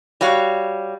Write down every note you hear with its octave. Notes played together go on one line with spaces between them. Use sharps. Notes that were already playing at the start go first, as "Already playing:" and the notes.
G3 F#4 C#5 F5